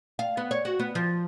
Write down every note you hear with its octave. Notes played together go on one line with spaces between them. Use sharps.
F5
B3
C#5
F#4
B3
F3